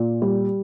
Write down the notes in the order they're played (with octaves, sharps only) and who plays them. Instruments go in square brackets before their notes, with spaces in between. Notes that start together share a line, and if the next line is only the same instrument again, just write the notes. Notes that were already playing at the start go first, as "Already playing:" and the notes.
Already playing: [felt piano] A#2
G3